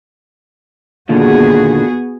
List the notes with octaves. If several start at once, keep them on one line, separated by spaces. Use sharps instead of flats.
D#2 A#2 D3 B3 F#4 G#4